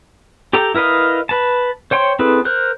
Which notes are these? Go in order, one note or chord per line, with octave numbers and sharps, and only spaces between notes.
G4 A4 G5 A#5
E4 A#4 B4 D#5 F5
B4 A5
C5 C#5 G5 C6
C4 E4 G#4 A4 B4
A#4 C5 F#6